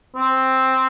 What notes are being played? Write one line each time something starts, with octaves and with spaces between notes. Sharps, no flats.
C4